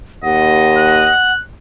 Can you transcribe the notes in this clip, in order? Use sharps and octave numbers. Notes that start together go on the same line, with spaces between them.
D#2 D#5 F#5
F#6